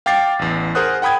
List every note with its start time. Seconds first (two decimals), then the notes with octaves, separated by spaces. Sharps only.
0.06 F5 G5 D6 A6 C7
0.39 A1 E2
0.75 G#4 A#4 C5 F#5 D#6 F#6
1.02 F#5 G5 B5 D#6 G#6